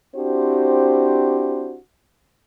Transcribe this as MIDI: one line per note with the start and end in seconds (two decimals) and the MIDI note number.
0.15 1.76 60
0.15 1.76 62
0.15 1.76 64
0.15 1.76 66
0.15 1.76 67
0.15 1.76 72